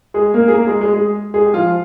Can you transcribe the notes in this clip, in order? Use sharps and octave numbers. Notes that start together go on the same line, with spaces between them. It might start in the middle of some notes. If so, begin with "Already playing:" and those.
G#3 G#4
A#3 A#4
G#4
A#3 A#4
G#3 G#4
G#3 G#4
G#3 G#4
G#3 G#4
G4
F3 F4